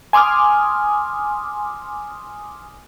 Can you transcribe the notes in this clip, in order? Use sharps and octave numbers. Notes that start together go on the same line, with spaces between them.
G#5 C6 D6 D#6 F6